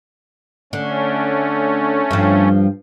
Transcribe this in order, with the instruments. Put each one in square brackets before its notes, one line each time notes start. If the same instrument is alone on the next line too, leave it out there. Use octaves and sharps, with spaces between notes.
[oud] D3 [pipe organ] A3 C#4
[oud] G2 F3